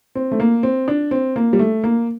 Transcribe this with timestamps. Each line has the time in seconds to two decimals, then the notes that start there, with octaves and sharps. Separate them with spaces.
0.15 C4
0.31 A3
0.40 A#3
0.63 C4
0.88 D4
1.11 C4
1.36 A#3
1.53 G3
1.59 A3
1.84 A#3